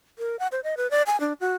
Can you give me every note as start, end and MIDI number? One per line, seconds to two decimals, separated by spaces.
0.19 0.39 70
0.39 0.47 78
0.52 0.60 72
0.64 0.75 75
0.77 0.90 71
0.91 1.02 74
1.07 1.19 80
1.20 1.33 62
1.41 1.56 66